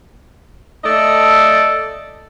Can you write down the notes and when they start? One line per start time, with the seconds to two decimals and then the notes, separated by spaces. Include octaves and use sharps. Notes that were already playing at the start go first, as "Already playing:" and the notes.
0.84 A3 A4 D5 D#5